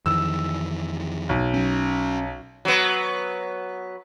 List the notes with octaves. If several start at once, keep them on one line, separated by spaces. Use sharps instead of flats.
F2 D#3 E3 E6
B1
F#3 C#4
F#3 B3